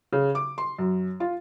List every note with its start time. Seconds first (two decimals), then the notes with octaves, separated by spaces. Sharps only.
0.12 C#3
0.35 D6
0.58 C6
0.78 F#2
1.20 F4